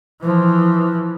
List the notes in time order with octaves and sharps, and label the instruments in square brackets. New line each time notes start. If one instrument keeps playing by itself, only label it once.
[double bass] E3 F3